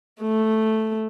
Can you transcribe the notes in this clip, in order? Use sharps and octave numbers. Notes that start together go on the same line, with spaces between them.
A3